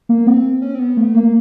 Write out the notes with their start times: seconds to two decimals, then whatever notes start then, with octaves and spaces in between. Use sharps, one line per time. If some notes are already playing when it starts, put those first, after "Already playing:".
0.09 A#3
0.27 C4
0.62 C#4
0.75 C4
0.79 B3
0.97 A3
1.15 A#3